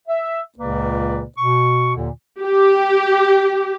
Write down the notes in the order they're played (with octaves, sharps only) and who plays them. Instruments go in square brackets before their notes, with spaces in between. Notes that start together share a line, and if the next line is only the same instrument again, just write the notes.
[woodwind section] E5
C#2 A#2 C#3 A#3 B4 D5
B2 C#6
D#2 A#2 D3
[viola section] G4